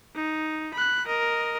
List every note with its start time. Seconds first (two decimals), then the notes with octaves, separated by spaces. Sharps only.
0.15 D#4
0.74 B5 F#6
1.06 A#4 D#5